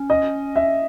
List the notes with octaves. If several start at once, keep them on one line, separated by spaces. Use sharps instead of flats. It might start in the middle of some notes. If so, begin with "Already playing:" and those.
Already playing: C#4
D#5
E5